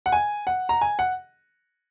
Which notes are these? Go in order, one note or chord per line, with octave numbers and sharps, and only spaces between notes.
F#5
G#5
F#5
A#5
G#5
F#5